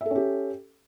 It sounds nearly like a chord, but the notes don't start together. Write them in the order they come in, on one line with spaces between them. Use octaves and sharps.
E5 A4 C#4 G4